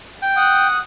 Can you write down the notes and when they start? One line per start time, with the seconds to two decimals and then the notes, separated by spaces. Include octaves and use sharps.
0.22 G5
0.37 F#5 D#6